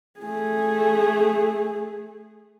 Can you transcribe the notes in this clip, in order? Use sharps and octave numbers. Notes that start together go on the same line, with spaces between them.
A3 G#4